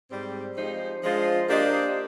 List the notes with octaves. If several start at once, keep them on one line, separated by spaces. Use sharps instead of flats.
G#2 G3 C4 G4 C5
F3 G#3 D#4 G4 C5
F3 G#3 D4 F4 C5
A#3 D4 G4 C5 D#5